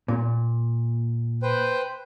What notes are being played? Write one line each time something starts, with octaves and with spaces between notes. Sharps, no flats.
A#2
B4 C5 G5